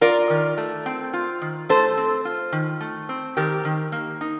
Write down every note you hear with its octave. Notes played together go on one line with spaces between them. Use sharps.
F4 A#4 D5
D#3
A3
C4
F4
D#3
A3 A4 C5
C4
F4
D#3
A3
C4
D#3 G4 A#4
D#3
A#3
D#4